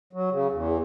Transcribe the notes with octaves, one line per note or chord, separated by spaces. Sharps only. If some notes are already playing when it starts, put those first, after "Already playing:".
F#3
C#3
E2